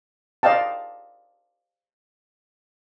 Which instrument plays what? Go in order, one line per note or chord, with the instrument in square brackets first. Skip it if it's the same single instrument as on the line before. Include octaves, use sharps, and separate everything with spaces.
[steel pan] D5 D#5 F5 G5 A5